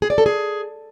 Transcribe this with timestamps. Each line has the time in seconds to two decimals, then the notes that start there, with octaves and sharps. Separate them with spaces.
0.02 G#4
0.10 D5
0.18 A4
0.26 G#4